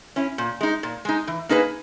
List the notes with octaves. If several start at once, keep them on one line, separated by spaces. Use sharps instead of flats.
C#4 E4
A#2
G#3 D#4
A#2
G#3 D#4
E3
A#3 D#4 G#4 B4